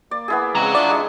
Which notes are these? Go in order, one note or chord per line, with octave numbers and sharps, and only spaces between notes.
A#3 D5
B3 E4 G#4
C#3 G#3 C4 F#5 A#5
D4 F4 D5 E5
G#3 D#6